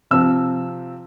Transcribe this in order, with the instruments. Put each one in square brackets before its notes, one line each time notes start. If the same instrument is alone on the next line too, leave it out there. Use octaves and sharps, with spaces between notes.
[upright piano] C3 F3 C4 E6